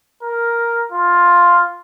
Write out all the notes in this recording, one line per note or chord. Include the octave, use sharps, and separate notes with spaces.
A#4
F4